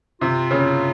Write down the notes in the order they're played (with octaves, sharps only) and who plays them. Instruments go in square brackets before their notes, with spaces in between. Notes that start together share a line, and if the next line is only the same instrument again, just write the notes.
[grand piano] C3 [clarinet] F4
[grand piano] C#3